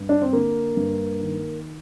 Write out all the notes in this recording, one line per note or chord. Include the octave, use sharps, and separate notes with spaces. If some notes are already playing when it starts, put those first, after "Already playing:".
Already playing: G2
D4
C4
D3 A#3
G2
D#3